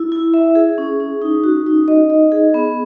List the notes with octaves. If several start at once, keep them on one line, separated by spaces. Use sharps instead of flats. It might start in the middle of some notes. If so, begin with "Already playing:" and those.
Already playing: E4
E4
E5
G#4
C#4
C#4
D#4
F#4
D#4
D#5
D#5
G#4
B3